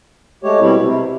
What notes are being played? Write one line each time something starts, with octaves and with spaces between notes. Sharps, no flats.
G#3 A3 G4 C#5
B2 G3 C4 E4
C3